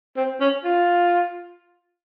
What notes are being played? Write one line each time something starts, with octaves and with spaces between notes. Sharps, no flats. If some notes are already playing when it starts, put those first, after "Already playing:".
C4
C#4
F4